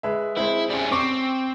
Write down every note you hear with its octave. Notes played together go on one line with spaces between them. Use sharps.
G#3 B4 E5
G#3 C4 E4
G3 C#4
C4 C#6 D6